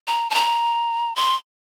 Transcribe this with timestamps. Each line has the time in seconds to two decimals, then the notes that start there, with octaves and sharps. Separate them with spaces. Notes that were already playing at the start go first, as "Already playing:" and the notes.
0.07 A#5
0.30 A5
0.35 A#5
1.16 C6